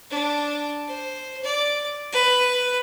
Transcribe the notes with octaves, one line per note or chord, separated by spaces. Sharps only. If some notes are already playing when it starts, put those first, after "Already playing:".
D4
C5
D5
B4